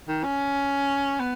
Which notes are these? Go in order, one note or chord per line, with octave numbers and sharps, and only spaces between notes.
D#3
C#4
B3